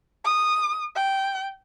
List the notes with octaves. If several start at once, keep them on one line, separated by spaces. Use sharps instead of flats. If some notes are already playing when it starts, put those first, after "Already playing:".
D#6
G5